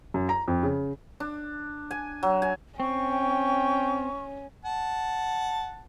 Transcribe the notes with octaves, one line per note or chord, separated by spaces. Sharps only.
F#2
A#5
F2
C#3
D4
G#5
F#3
G#5
C4 C#4 G5 C#6
F#5 A5